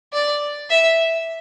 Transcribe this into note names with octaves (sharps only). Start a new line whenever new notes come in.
D5
E5